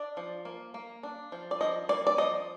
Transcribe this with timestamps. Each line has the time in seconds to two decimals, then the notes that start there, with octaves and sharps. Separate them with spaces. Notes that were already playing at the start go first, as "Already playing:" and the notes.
Already playing: D4 D5
0.17 F3
0.45 A#3
0.74 A#3
1.03 D4
1.32 F3
1.51 D5
1.61 F3 D#5
1.89 A#3 D5
2.07 D5
2.18 F3 D#5